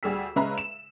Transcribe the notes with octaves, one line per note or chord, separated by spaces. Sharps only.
D2 G3 G#4 E6 B6
C#3 G#3 B4 E5 A#5 B5
E7